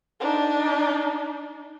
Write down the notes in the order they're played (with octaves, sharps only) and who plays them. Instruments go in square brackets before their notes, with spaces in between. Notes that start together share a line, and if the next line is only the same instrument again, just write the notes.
[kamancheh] D4 D#4